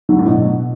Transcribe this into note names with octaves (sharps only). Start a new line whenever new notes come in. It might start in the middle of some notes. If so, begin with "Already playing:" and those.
D3 F#3
A2
B2